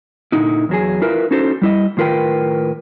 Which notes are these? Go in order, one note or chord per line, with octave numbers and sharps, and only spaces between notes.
A#2 D3 D#4 E4
E2 F#3 G#4
E4 F4 A#4 B4 E5
C#4 D#4 E4 F#4 A4 C5
G3 E4 D#5
A2 D#3 F4 A#4 B4 G5